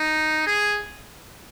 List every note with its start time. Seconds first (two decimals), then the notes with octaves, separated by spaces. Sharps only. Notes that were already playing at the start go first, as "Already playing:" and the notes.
Already playing: D#4
0.46 G#4